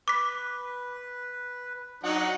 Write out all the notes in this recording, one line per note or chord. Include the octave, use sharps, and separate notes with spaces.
B4 D6 B6
F#3 D4 D#4 F#5